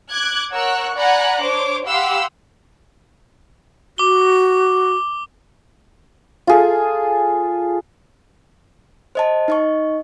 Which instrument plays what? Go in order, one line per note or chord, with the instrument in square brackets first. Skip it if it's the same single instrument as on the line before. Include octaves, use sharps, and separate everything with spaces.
[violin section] D6 F#6 G#6
A#4 C#5 F#5 C#6 E6 F#6
D5 F#5 G#5 A#5 B5 F#6
D4 C5 C#5 D6
G4 F5 F#5 B5 C6 E6
[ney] F#4 [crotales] D6 G7
[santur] F4 G#4 A4
[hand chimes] C5 D#5 A5
D#4 D#5 C#6